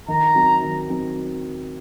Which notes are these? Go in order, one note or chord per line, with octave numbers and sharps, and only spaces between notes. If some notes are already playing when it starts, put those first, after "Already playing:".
D#3 A#5
F#3 C4 D#4
D#3
F#3 C4 D#4